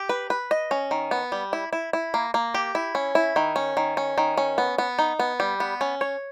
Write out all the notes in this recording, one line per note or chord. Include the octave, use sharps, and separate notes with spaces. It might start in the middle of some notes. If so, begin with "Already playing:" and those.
Already playing: G4
B4
B4
D#5
C#4
D#3
B3
G3
E4
E4
E4
A#3
A#3
G4
E4
C#4
E4
D#3
C#4
D#3
C#4
D#3
C#4
B3
B3
D#4
B3
G3
B3
C#4
C#5